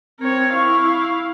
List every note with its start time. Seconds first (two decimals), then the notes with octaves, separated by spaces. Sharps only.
0.20 C4 A#4 C#5
0.54 E4 F5 C#6